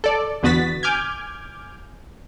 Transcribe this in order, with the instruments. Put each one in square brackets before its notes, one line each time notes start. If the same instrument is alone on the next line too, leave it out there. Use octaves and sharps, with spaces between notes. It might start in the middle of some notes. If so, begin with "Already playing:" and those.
[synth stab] A4 D5
E2 D3 B3 F#4 A6 B6
G#5 D6 F6 G6 G#6